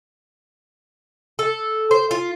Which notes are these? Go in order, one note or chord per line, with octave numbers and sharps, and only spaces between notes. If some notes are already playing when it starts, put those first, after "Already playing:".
A4
C5
F4